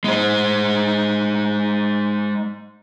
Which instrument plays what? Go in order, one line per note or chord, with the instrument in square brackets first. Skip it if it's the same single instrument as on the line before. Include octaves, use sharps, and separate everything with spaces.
[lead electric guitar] G#3 C5